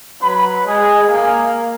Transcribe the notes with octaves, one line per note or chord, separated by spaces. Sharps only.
F#3 B4 B5
G#3 G#4 G#5
A#3 G#4 G#5